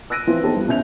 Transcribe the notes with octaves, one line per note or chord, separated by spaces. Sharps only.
E6 F#6 A#6 D7 D#7
E3 F3 C4 E4 F4 B4
B3 D#4 G4 A4 C5 A5
G2
B2 C#4 E5 G6 F7